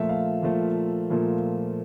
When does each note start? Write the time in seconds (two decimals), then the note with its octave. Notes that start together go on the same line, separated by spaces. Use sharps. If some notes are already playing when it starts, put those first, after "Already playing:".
Already playing: A#2 F3 A3 E5
0.09 F5
0.42 A#2 F3 A3
1.10 A#2 F3 A3